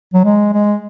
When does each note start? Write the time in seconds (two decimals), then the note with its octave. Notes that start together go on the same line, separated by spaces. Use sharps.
0.14 F#3
0.24 G#3
0.53 G#3